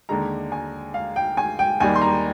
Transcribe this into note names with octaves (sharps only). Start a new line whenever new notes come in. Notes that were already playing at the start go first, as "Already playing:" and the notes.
D#2 D3 G#3 A#5
G#5
F5
G5
G#5
G5
D#2 D#3 G3 G#5
C6
A#5